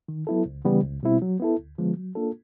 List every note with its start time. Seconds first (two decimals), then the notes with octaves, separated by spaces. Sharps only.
0.08 D#3
0.27 F#3 B3 E4 A4
0.46 C#2
0.65 C#3 E3 G3 B3
0.84 C#2
1.03 B2 G3 C4 E4
1.22 F#3
1.40 B3 E4 A4
1.59 D2
1.78 D3 F3 G#3 B3
1.97 F#3
2.15 A#3 D4 F4 A4